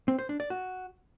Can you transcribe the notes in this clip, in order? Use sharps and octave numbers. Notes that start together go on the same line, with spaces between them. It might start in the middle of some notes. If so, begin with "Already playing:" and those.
C4
C5
D4
D5
F#4